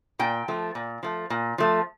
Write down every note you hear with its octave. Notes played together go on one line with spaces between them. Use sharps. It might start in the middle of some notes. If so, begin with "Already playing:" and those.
A#2 G5
F3 A3
A#2
F3 A3
A#2
F3 A3